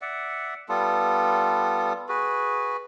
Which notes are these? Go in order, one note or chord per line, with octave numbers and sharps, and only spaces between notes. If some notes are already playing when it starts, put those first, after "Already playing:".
D5 E5 F#5
G3 B3 F4 A4
F#4 G#4 B4